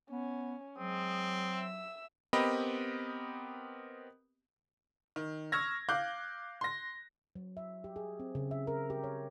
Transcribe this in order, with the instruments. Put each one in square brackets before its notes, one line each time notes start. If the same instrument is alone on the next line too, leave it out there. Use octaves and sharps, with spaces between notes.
[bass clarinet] B3 [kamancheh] C#4
[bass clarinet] F#3 [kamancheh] G#3 D#6 [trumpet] C4
[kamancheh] E5 E6
[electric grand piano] B3 C4 G4 A#4 D#5 B5
[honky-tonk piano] D#3
C#6 E6 F6 G#6 A#6
F5 D6 F#6 G6
C6 A#6
[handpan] F#3
E5
G4
G#4
C4
C#3
E5
A#4
G4
C#5